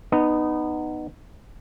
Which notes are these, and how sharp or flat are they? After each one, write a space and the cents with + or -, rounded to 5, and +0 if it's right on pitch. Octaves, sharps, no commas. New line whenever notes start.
B3 +5 D#4 -20